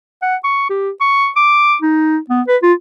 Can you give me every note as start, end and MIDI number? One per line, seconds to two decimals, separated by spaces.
0.22 0.35 78
0.44 0.68 85
0.70 0.90 67
1.01 1.28 85
1.36 1.75 86
1.82 2.18 63
2.30 2.42 59
2.48 2.57 71
2.63 2.73 65